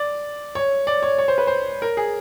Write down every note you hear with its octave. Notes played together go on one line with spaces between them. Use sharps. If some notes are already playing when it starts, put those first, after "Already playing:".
Already playing: D5
C#5
D5
C#5
C#5
C5
B4
C5
A#4
G#4